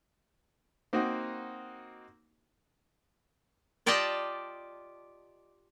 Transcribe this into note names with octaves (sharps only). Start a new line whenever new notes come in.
A#3 C4 D#4 F#4
F4 G4 D5 D#5 G5 A5